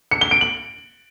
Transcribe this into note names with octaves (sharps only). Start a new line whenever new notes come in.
C#7
G7
D7
F#7